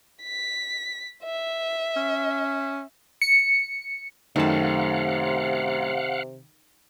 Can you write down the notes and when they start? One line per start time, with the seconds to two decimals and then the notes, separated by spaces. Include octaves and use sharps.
0.23 B6
1.24 E5
1.96 C#4
3.22 C#7
4.36 F#2 C3 D#3 A3 F5 F#5 A5